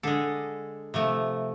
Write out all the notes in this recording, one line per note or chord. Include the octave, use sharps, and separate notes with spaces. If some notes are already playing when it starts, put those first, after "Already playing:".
D3 G#3 A4
C3 F3 A3